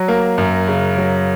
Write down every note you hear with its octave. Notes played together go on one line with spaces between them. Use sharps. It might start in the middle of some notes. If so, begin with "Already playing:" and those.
Already playing: F#3
A#3
F#2
C#3
F#3